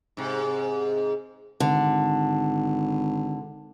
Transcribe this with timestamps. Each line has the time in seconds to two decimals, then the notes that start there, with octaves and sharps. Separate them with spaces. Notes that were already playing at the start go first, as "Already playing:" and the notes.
0.17 G#2 C3
1.60 G#1 D3